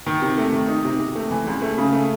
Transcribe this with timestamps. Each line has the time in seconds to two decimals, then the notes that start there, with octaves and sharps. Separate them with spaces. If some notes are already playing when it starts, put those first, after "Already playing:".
0.06 D#3
0.22 C3
0.38 A3
0.52 D#3
0.68 D#4
0.85 C3
1.00 C3
1.15 A3
1.31 E3
1.47 C#2
1.62 A3
1.78 C#3
1.93 A3